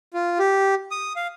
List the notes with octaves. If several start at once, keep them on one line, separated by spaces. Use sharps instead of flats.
F4
G4
D#6
F5